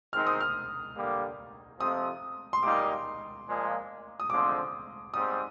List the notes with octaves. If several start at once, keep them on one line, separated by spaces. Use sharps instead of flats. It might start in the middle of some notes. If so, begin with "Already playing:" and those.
D#3 G#3 C4 D#4 F6
D#6
F6
D3 G3 A#3
F2 C3 F3 C4 D#6
C6
A#2 G3 A#3 D#4 D6
A#2 F3 G#3
D#6
D3 F3 G#3 C4 D6
G#2 G3 C4 D#6